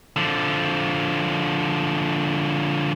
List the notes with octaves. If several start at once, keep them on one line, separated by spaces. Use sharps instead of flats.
D3 F3